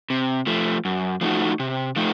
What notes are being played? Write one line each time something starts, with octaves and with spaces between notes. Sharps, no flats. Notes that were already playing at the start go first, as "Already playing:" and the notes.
C3
F3 A3
F#2
F3 A3 D#4 F#4
C3
F3 A3 D#4